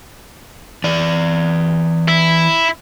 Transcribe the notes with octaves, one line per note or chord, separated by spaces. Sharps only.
E3 D5
E4